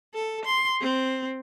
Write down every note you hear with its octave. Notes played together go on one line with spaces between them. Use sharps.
A4
C6
C4